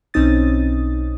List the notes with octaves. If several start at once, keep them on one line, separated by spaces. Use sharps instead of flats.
B1 C4 C#4 D#4 D#6 A6